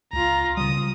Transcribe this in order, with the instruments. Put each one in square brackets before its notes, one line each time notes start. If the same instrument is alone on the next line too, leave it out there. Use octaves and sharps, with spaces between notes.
[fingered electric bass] C#2 [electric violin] F4 A#5
[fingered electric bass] C#3 G3 [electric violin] D#6